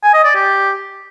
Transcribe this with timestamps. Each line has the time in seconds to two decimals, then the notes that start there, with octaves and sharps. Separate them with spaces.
0.03 G#5
0.14 D#5
0.25 D5
0.35 G4